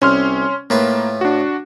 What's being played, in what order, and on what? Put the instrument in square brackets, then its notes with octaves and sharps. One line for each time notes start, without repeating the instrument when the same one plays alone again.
[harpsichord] C2 [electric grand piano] C#4 C6 F6
[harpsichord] A2 F4 B4 [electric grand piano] A#3
[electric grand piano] D4 F#4